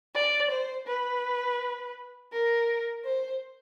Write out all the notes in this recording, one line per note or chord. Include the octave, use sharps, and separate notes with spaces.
D5
C5
B4
A#4
C5